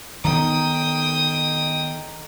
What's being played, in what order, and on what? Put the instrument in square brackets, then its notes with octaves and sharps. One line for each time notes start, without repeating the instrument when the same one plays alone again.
[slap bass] D#3 B3 [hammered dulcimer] D#4 A4 [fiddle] G5 D#6